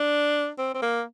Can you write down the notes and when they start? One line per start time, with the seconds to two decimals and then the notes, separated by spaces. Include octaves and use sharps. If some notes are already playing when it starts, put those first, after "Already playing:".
Already playing: D4
0.58 C4
0.74 C4
0.82 A#3